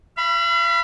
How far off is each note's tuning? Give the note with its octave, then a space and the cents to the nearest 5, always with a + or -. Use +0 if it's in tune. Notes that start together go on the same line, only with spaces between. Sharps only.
F5 -45 B5 +0